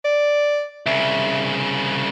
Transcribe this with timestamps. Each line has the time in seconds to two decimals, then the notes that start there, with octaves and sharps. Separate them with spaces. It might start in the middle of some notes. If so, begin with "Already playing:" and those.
0.05 D5
0.86 C2 C#3 E5